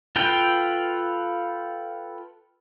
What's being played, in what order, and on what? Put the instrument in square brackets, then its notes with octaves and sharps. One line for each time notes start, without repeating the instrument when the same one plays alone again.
[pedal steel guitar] F4 A4 B4 F5 G5